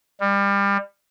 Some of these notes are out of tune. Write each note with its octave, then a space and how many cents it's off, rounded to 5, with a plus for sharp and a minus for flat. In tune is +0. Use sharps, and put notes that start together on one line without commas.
G3 +30